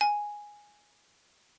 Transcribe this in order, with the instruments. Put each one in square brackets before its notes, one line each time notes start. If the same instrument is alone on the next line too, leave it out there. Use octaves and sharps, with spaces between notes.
[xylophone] G#5